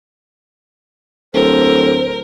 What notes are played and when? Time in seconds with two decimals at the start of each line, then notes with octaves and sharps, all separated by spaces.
1.34 D1 A4 A#4 C5